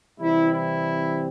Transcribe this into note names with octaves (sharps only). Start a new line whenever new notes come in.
C3 E3 G3 C4 E4
E4